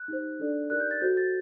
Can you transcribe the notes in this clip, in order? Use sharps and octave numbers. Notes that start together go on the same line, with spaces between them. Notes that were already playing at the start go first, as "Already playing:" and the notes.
Already playing: F#6
D#4 G4 C5
D4 A4 D5
D#4 G4 A#4 D5 F#6
G6
A6
F#4 A4 C5 G6
A6